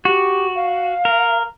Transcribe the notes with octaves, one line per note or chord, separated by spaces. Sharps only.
F#4 G4
F5
A#4